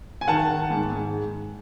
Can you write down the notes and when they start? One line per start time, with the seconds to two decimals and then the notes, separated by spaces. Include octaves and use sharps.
0.21 G#5
0.28 D#3 F#5 A5
0.49 D#3
0.70 G#2
0.92 G#2